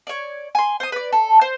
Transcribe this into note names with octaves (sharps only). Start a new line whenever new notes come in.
C#5 D5
G#5 C6
C5 D#6
B4 D5
A4
C5